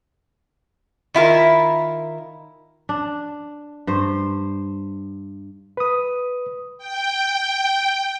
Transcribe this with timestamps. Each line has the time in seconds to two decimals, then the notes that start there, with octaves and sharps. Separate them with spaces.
1.14 D#3 E4 F4 A#4
2.89 D4
3.87 G2 C5
5.77 B4 D#6
6.78 G5